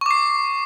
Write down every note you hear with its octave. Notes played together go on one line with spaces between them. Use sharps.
C#6 D6 C7